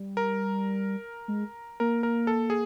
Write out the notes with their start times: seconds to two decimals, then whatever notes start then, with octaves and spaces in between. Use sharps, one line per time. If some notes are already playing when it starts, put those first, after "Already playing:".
Already playing: G3
0.17 A#4
1.28 G#3
1.80 A#3 A#4
2.03 A#4
2.27 A4
2.50 G#4